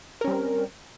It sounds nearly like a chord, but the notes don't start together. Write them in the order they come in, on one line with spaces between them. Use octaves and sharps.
A#4 C#4 G3 C4